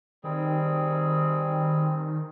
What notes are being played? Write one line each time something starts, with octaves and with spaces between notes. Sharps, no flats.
D#3 G3 C4 G#4